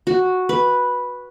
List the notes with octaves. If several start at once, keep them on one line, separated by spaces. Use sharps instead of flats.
F#4
B4